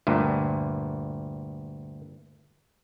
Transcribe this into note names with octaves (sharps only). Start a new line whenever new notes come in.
D2 G2 A#2